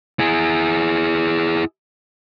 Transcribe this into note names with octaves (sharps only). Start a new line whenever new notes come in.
E4 G#4